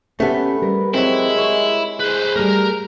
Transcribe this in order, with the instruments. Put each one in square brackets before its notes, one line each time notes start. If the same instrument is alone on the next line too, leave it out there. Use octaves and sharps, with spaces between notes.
[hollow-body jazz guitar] A3 B3 [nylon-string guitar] C#4 G4 A4 [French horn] B4
[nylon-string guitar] G3 A#4
[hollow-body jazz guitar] F#3 C4 [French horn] G#3 [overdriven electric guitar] E4
[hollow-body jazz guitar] C#5
[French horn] G#4 [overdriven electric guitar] B4 C5
[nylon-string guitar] G3 A3 [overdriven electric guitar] A#4 A#5